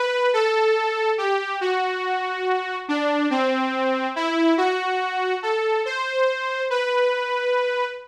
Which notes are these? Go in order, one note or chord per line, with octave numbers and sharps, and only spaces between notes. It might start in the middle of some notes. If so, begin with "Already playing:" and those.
Already playing: B4
A4
G4
F#4
D4
C4
E4
F#4
A4
C5
B4